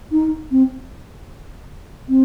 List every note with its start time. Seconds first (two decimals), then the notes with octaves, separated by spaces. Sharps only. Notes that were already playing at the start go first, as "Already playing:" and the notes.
0.12 D#4
0.51 C4
2.09 C4